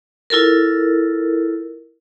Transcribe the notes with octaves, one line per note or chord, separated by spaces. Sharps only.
E4 F4 A4 A#4